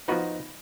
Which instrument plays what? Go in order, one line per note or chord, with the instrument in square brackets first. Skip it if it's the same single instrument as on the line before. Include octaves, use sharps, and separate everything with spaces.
[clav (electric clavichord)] F3 B3 F#4 B4 [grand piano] D#4